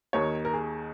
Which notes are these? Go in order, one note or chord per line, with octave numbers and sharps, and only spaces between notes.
D#2 D#3 C#5
A#4
G#4